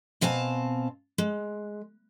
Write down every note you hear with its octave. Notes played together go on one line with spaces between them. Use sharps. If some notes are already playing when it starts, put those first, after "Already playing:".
B2 C4 F5 G#5 A5
G#3